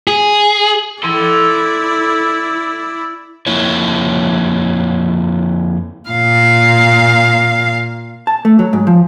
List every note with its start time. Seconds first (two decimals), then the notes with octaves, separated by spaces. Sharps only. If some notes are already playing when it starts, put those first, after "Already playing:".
0.07 G#4
1.03 E4 A4 D5 C6
3.46 F2 A#3 E4 C#5
6.09 A#2 F5
8.27 A5
8.45 A3
8.59 F#3
8.73 G#2
8.87 F3